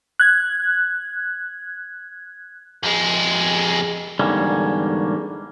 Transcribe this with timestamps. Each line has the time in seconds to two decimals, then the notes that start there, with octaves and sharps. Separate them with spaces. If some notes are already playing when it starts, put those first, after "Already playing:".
0.20 F#6 G#6
2.83 F2 G#3
4.19 E2 G#2 D3 G3 A#3 C#4